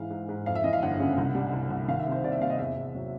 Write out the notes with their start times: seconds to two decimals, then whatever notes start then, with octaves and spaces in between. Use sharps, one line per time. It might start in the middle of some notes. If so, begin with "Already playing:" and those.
Already playing: G#2 E3 F5
0.10 G#2
0.29 G#2
0.46 F2 F5
0.55 E5
0.64 E3 D#5
0.73 F5
0.82 G1 F#5
1.00 C#3
1.18 C2
1.35 G3
1.53 C2
1.70 C2
1.88 D#3 F5
1.99 E5
2.06 C3
2.12 C5
2.24 C3 D5
2.32 E5
2.41 C3 F5
2.50 D#5
2.59 E2 E5
2.77 E2
2.95 F#3